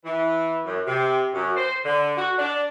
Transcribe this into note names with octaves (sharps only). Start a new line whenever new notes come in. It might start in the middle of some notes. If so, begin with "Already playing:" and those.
E3
F#2
C3
F#2
C5
D3
F#4
D4